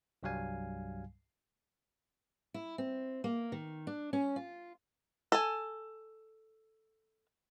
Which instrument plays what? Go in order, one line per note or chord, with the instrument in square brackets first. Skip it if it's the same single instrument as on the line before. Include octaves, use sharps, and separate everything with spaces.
[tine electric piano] C2 G2 F#3 G3 F5 G#5
[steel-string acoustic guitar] E4
C4
A#3
D#3
D4
C#4
F4
[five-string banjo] A4 G#5